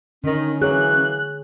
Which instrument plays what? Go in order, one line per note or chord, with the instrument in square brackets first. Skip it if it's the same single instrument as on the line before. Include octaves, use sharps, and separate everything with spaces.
[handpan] D3 [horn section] D#3 [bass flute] C#4
[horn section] E3 F#3 A#3 [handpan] G#4 C#5 [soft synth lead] F#6